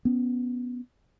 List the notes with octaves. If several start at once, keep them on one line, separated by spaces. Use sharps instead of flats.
B3 C#4